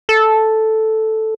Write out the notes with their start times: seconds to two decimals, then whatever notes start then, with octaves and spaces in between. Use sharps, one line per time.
0.09 A4